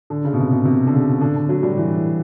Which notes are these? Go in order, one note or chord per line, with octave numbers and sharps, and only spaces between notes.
D3
C#3
B2
C3
B2
C3
D3
C#3
D3
D3
F#3
G3
E3
E3